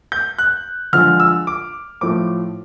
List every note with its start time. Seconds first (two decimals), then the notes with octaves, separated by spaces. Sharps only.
0.12 G6
0.39 F#6
0.93 D3 F3 G#3 F6
1.20 E6
1.47 D6
2.01 A2 F3 A3 D6